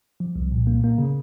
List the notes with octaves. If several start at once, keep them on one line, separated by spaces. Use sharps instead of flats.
F3
C2
A#2
A#3
A#3
C#3